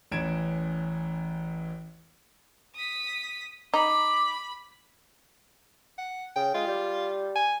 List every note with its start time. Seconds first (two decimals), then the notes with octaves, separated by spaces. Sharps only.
0.12 A1 E2 C#4 G#6 D7 E7
2.75 D#6 B6
3.74 D#4 B5 D6
5.98 F#5
6.36 C#3 G5
6.54 G#3 F4
6.67 G3
7.36 G#5